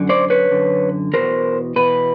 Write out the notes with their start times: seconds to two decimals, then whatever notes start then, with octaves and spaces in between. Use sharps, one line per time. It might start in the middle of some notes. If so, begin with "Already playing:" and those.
Already playing: F#2 D3
0.09 C5 D5
0.30 B4 C#5
0.51 F#2 D3
1.13 E2 B2 A#4 C5
1.76 E2 B2 B4